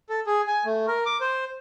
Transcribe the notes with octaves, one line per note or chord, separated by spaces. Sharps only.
A4
G#4
G#5
A3
A#4
D6
C5